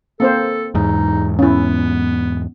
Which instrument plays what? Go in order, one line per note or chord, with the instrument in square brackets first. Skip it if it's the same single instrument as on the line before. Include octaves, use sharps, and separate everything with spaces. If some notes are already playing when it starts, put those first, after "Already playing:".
[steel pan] A#3 C4 C5 [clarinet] A4
[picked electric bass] E2 G#2 [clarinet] D#4
[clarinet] B3 [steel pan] C#4 E4